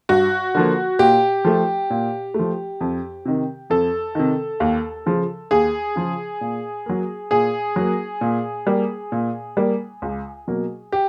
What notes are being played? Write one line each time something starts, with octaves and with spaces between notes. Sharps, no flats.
G2 F#4
D3 F3 A#3
A#2 G4
F3 A3
A#2
F3 A3
F2
C3 D#3
F2 A4
C3 D#3
D#2
C#3 F3
D#2 G#4
C#3 F3
A#2
F#3 A#3
A#2 G#4
F#3 A#3
A#2
G3 A#3
A#2
G3 A#3
C#2
B2 F#3 A#3
G4